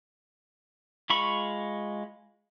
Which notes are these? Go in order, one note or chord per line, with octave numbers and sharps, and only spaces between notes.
G#3 F4 B5 C#6